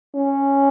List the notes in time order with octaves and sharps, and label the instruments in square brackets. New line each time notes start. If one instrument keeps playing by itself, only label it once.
[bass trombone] C#4